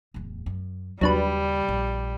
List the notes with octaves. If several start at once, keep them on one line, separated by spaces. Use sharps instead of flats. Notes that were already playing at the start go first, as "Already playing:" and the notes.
D1 E2
F#2
D#2 C#3 F#3 G3 D4 B4
A#1